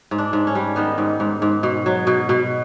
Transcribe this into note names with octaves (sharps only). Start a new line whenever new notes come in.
G#2
D4
G#2
C#4
G3
D#3 B3
G#2
G#2
G#2
B2
F#3
B2
B2